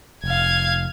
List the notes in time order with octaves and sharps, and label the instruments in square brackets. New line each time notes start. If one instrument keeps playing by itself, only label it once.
[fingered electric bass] F1 [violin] F5 G#6